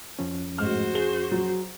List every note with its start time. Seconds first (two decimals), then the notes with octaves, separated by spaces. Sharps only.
0.19 F2 F3 C#4
0.58 A1 G#2 F#4 C5 F6
0.94 G#4 G7
1.32 F#3